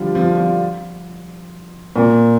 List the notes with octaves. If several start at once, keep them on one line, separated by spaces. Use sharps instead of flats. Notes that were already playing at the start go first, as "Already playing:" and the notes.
Already playing: D3 F3 G3
F3
F3
A#2